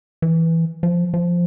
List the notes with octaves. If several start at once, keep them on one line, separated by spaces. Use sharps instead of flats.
E3
F3
F3